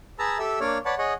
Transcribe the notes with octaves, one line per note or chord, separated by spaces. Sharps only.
G#4 B4 A5 A#5 E6
G4 A4 E5 E6
A#3 D4 C#5 D5 F6
B4 C#5 D5 F#5 A5
G#4 C#5 D#5 F#5